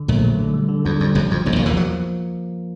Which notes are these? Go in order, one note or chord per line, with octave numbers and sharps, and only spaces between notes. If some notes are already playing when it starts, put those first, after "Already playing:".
Already playing: D3
A#1 A#2 A3
F#3
D3
G3
D3
E2 D3
F2 G3
F#1 F#2 F3
F2 F3
F#1 F#2 A#3
A#1 A#2
E2 E3 A#3
F3 F#3